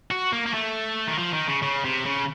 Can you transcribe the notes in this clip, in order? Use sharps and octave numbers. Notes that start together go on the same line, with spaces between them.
F#4
A#3
A#3
A3
D#3
F3
D#3
C#3
C#3
C3
C#3